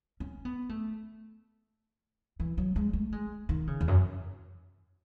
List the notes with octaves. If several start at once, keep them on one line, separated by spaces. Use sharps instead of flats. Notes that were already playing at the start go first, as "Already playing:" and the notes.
C#4
B3
A3
E3
F#3
G#3
A3
G#3
D#3
C#3
E2
F#2